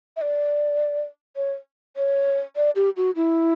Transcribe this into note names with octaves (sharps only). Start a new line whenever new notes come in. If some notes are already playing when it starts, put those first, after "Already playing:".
E5
D5
C#5
C#5
D5
G4
F#4
E4